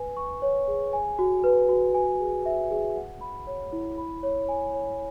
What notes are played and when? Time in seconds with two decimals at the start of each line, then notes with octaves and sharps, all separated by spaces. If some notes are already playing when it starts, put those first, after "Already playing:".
Already playing: B4 G#5
0.17 C#6
0.42 C#5
0.68 G#4
0.93 G#5
1.19 F#4
1.44 B4
1.69 F#4
1.94 G#5
2.20 G#4
2.46 E5
2.71 G#4
2.97 F#5
3.21 B5
3.47 C#5
3.73 E4
3.98 B5
4.23 C#5
4.49 G#5
4.74 C#5